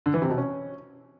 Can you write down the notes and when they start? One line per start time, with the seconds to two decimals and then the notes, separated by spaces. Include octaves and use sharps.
0.06 D3
0.14 E3
0.22 C3
0.30 B2
0.38 C#4